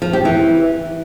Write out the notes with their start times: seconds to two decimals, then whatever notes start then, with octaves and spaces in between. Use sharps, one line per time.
0.02 F3
0.13 G4
0.25 E3